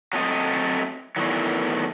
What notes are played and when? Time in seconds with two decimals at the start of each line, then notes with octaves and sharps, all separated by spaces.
0.13 F#3 A3 C4 D#5
1.16 E2 A2 D#3 E3 F#3